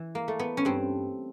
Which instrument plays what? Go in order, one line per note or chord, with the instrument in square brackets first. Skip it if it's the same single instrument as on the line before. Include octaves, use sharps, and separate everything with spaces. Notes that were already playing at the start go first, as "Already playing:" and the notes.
Already playing: [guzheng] E3
A#3
A3
B3
C#4
G2 C4